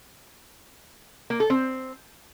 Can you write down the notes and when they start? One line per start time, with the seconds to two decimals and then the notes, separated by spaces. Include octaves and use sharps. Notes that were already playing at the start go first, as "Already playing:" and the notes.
1.30 A#3
1.40 A4
1.50 C4